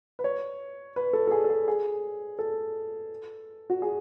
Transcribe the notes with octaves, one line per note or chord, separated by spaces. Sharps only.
B4
C#5
B4
A4
A4
G#4
A4
G#4
G#4
A4
F#4
G#4